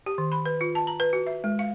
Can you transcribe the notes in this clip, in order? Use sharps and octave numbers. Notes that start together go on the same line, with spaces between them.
G4
D#3
B5
B4
F4
A5
A#5
B4
F#4
E5
G#3
F5